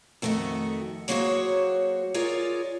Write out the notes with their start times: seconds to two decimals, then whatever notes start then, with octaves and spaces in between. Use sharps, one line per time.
0.22 F2 D#3 A3 F#4 E5
1.08 F#3 A#3 F#4 G#4 C5 C#5
2.14 F4 G#4 A#4 C#5 D5